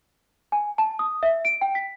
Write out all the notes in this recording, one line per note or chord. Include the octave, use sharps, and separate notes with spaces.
G#5
A5
D#6
E5
D7
G5
B6